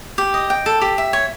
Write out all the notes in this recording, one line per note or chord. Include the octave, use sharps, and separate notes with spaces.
G4
D#5
G5
A4
G4
E5
C#5